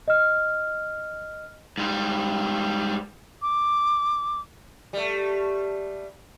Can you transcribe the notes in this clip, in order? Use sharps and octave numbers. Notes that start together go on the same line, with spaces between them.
D#5 F6
G#2 G3
D6
G3 A3